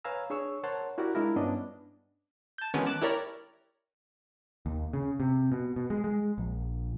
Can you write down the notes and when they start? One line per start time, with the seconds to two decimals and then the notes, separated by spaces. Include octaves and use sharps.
0.05 B4 C#5 F5 G#5 A#5 E6
0.30 D4 G#4 C#5 C#6 E6
0.63 A#4 C5 C#5 F#5 A5 C6
0.98 E4 F#4 G4 A#4 D5 F#5
1.15 G#3 D4 E4 F4 A#4
1.36 G2 B3 C#4 D4 D#5
2.58 A5 G6
2.74 D#3 E3 F#3 G#3 B3 C#4
2.86 A5 D6 F#6
3.02 E4 G4 A#4 C#5 D5 A#5
4.66 D#2
4.93 C#3
5.20 C3
5.52 B2
5.76 B2
5.90 G#3
6.04 G#3
6.38 A#1